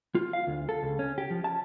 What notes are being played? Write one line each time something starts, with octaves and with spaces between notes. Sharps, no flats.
F4
F5
D2
A4
C#2
C#4
G4
F3
A5